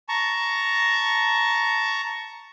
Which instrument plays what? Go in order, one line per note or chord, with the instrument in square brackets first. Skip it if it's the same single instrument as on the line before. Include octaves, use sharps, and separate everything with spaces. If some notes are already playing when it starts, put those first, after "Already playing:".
[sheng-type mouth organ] A5 A#5 C#6